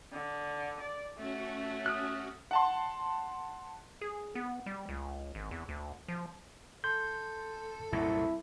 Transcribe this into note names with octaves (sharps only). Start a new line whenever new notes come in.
D3
D5
A3 C#4 F#4
D#6 F6 F#6
F#5 A5 C6
G#4
B3
G3
C#2
G#1
E2
D2
F3
A4 C6 G6
C2 F#2 A#2 E4